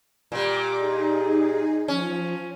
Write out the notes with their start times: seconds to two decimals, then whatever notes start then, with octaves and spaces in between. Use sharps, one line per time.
0.32 A#2 G3 D6
0.75 D#4 G#4
1.88 F3 C#4